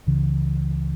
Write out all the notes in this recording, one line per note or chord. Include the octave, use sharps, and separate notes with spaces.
C#2 C#3 E3